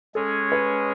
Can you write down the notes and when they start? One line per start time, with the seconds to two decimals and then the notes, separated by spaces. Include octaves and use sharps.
0.15 G#3 C#4 G#4 A4 C#5
0.52 B4